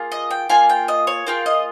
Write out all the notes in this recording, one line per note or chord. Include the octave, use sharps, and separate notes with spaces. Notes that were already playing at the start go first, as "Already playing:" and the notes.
Already playing: A#3 F4 G#4
D#5
G5
A#3 F4 G#4 G#5
G5
D#5
C#5
A#3 F4 G#4 G5
D#5